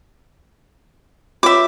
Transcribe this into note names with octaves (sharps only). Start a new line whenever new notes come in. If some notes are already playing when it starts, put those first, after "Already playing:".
F4 C#5 E5 D6